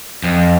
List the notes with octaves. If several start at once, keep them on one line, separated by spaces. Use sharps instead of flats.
F2